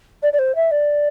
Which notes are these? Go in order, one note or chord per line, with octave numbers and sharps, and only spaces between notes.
D5
D5
C5
E5
D5